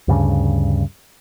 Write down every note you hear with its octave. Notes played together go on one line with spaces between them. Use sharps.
D2 G2 C#3